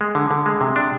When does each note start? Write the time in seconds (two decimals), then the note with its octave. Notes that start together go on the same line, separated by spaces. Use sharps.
0.01 G#3
0.15 D3
0.31 D3
0.46 G#3
0.61 C3
0.76 D4